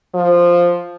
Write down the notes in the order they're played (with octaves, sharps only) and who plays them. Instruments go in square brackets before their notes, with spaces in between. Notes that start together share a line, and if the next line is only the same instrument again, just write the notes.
[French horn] F3